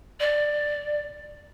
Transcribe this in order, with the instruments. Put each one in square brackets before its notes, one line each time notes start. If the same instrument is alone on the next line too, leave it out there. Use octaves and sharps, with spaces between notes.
[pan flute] D5